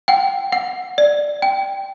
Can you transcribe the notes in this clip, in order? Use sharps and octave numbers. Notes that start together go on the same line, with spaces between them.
F#5 G5
F#5
D5
G5